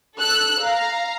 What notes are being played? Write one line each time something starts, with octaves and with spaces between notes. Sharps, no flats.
A4 E6 F#6
F5 A#5